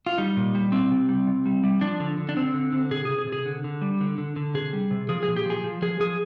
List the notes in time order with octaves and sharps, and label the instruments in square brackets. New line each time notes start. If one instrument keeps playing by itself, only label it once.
[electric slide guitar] F4
G3 D#4
A#2
G3
G3 C4
C3
G3
C3
G3
G3
F3 D4
D3
D3
D4
D3 C4
D3
D3
C3 G#4
C3 G#4
G#4
C3
G#4
D3
D3
G3
D3
D3
D3
C3 G#4
G3
C3
F3 G#4
A#2 G#4
G4
F3 G#4
F3
F3 G#4
F3 G#4